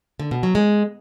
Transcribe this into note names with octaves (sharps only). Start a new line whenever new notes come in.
D3
B2
F#3
G#3